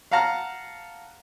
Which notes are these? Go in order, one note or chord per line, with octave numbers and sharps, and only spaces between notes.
F5 F#5 A5 A#5 F6